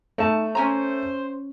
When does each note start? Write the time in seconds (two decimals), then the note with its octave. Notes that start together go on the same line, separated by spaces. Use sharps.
0.18 A3 D#4 A5
0.55 C#4 C5 G#5 A#5